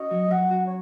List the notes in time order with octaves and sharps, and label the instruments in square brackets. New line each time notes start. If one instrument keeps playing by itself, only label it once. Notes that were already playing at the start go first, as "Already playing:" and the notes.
Already playing: [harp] C#4 F#4 [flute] D#5
[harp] F#3
[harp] F#3 [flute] F#5
[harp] F#4
[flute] C#5